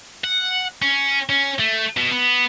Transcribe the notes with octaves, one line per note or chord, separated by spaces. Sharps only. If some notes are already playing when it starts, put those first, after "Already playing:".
F#5
C#4
C#4
A3
B2
B3